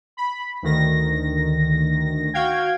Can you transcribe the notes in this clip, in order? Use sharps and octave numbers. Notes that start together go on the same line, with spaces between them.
B5
D2 D#3 A#6
F#4 F5 G5 G#6